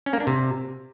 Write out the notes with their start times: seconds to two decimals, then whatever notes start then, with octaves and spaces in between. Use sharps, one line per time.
0.06 C#4
0.13 A#3
0.20 D4
0.27 C3